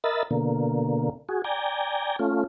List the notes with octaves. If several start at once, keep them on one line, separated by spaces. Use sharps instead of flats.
A#4 D#5 E5 B5 A6
B2 D3 A#3
F#4 G#4
D5 G5 G#5 A#5
A3 C#4 F4